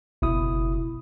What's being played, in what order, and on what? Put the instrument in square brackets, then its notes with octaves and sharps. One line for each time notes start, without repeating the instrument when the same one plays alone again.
[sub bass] F#1 [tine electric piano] B2 E4 D#6